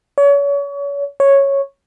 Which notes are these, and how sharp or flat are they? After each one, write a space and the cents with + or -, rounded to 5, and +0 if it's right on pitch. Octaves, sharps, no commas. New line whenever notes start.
C#5 +35
C#5 -5